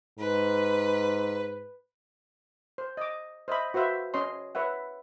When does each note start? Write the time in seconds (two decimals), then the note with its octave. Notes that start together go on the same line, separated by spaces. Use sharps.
0.19 G#2 B4
2.78 C5
2.97 D#5 D6
3.48 C5 D#5 E5 B5
3.74 F#4 B4 C5 E5 F5
4.14 C#4 C#5 D#5 C6
4.55 B4 C#5 E5 F#5